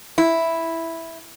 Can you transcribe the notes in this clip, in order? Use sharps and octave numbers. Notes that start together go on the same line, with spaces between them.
E4